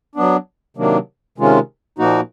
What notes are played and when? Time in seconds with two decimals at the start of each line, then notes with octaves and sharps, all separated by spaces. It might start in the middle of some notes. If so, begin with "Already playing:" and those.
0.15 F#3 B3 D4
0.77 C3 D#3 F#3 A#3 D4
1.38 C3 D#3 G#3 C#4 F4
1.99 A#2 F3 A#3 D#4 F#4